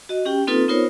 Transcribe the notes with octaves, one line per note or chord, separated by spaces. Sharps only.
F#4 D#5
C#4 G4 G5
A#3 C4 D#4 F4 A4 B4
B3 D#4 F4 A#4 C5 C#5